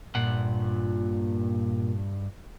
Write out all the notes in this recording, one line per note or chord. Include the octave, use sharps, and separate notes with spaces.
G2 A#2 F#5